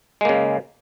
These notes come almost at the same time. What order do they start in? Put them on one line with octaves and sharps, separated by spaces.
G#3 A#3 C#3